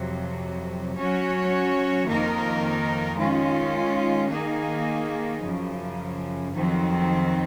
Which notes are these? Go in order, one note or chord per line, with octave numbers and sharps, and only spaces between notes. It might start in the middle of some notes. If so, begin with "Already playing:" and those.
Already playing: F2 C3 F#3
F#3 C#4 F#4 C#5
F2 D#3 A#3 D#4 A#4
D#3 G#3 C#4 F4
D#3 A#3 D#4 G#4
F#2 C#3 F3
F2 D#3 F#3 C4